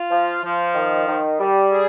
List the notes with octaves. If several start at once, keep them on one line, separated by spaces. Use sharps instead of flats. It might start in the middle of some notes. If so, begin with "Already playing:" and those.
Already playing: F4
F3
F3
D#3
D#3
G3
G#4